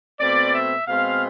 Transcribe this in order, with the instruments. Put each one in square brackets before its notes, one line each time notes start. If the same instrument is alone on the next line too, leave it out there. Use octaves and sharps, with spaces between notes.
[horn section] B2 A3 C4 D5
E5
B2 G#3 C4 F5